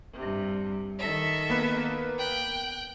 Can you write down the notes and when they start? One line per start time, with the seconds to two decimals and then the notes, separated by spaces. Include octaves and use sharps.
0.15 G2 C3
0.98 D#3 A4 E5
1.50 A#3 B3 B4
2.16 G5 F#6